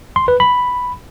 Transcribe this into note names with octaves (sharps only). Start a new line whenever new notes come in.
C6
B4
B5